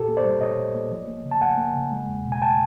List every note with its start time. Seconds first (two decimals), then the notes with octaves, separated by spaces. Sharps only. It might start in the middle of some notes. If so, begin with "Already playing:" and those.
Already playing: A#2 G4 A4
0.08 A#3
0.17 C5 D5
0.25 G3
0.41 A#2 C#5 D#5
0.58 A#2
0.74 A#3
0.91 F3
1.08 A#3
1.25 C#3
1.31 A5
1.41 F3 F#5 G#5
1.58 A#3
1.75 C#3
1.92 G#3
2.09 E2
2.25 B2
2.32 G#5
2.42 G5 A5